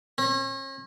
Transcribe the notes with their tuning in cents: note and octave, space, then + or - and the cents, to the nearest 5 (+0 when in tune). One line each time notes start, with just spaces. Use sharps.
C#4 -40